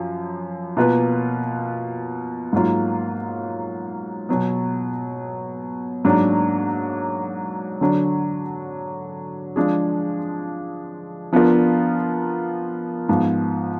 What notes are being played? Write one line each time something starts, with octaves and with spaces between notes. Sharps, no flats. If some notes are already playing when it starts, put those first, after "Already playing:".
Already playing: F#2 F3
B2 A#3 F4 B4
G#2 F#3 A#3 F4
B2 F#3 B3
G#2 F#3 A#3 D4
D3 F#3 D4
F3 G#3 D4 G#4
F3 B3 D4 F4 A#4
G#2 F3 B3